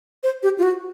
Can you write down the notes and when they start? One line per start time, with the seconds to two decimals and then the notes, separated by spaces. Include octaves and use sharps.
0.23 C5
0.43 G4
0.59 F4
0.63 F#4